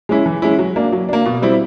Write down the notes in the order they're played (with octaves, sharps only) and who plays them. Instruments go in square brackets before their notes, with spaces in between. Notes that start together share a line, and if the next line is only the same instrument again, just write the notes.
[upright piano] G#3 C#4 E4
E3
G#3 C#4 E4
F#3
A#3 D4
F#3
A#3 D4
B2
G3 C4 E4